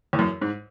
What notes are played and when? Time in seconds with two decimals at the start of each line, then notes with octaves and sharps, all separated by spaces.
0.13 E2
0.19 F#2
0.42 G#2